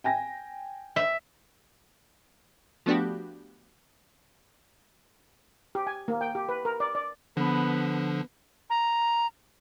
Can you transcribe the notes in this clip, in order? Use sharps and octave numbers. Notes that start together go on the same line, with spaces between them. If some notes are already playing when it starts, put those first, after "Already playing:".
G5 G#5 A#6
E5
F3 A3 B3 D4 F#4 G4
G4
G#5
A#3
G5
G4
B4
A#4
D5
D5
D3 F3 B3 D4 B4
A#5